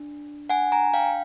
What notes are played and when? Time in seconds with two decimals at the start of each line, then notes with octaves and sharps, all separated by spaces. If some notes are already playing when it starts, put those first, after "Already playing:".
Already playing: D4
0.50 F#5 G#5
0.72 G#5 A#5
0.94 F5 G5